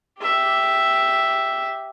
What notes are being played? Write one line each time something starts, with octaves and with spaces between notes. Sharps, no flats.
G4 E5